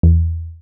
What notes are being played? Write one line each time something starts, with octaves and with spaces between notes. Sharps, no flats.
E2